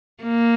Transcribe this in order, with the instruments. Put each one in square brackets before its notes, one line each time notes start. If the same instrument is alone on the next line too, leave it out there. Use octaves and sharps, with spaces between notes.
[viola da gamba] A#3